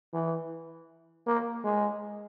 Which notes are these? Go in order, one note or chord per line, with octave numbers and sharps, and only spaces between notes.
E3
A#3
G#3